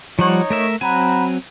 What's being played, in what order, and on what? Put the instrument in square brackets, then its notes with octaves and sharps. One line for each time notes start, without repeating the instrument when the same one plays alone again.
[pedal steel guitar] F3 G3 F#5 [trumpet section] D#4 C#5
[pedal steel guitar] A3 A#4 E5
[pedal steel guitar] F#3 C4 G#5 [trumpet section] F#5 A#5 B5